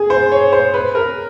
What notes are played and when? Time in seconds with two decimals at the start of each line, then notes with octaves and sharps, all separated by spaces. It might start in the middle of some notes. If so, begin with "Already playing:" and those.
Already playing: G#4
0.10 C5
0.32 C#5
0.52 C5
0.74 B4
0.95 A#4